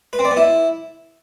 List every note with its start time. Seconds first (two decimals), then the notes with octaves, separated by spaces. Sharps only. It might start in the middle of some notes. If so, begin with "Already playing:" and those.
0.13 B4
0.19 C4
0.25 D5
0.31 B3
0.37 E4